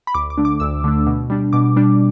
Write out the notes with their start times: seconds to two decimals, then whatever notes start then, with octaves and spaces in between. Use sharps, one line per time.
0.07 B5
0.14 D2 D6
0.30 D6
0.38 D3 A3 D4
0.45 D6
0.60 D2 E6
0.84 D3 A3 D4
1.06 B2
1.30 G3 D4
1.53 B2 D6
1.76 G3 D4